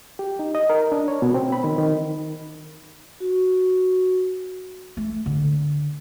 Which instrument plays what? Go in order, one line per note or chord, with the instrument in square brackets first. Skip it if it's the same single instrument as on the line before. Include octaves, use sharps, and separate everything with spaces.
[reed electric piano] G4
D#4
D#5
A#4
D4
C#5
B2
C4
B5
D#3
D#3
[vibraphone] F#4
[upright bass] A3
D3